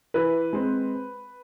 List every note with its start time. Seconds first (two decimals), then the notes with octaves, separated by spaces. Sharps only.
0.14 E3 B4
0.53 G#3 C4